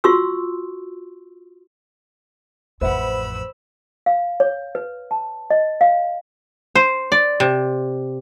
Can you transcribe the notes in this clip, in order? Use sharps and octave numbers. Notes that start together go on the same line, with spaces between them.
F4 F#4 C6 C#6 E6
A1 F2 B4 C5 E5 F#5 B5 E6
F5
C#5
B4
A5
D#5
F5
C5
D5
C3